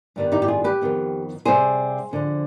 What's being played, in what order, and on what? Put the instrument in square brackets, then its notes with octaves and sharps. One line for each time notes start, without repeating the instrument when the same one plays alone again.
[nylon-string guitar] G2 D#3 G3 B3
D#4 G4
G4
F4 G#4
G4 B4
F2 D#3 B3
C3 G3 C4 G#4 C5
F2 D3 F3